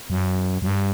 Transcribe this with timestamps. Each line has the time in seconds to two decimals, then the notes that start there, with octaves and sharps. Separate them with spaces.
0.10 F#2
0.62 F#2
0.67 G2